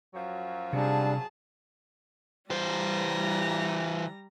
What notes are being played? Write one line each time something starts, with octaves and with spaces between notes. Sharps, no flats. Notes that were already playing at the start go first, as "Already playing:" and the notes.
F#2 F3 F#3
C3 G3 D4 G#4 A5
E3 G3 C5 A#5